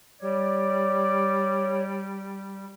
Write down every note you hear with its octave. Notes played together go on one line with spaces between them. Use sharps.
G3 C#5 D5